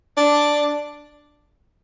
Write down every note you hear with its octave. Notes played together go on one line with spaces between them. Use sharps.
D4